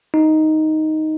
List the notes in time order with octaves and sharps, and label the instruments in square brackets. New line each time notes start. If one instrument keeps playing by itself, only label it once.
[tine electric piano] D#4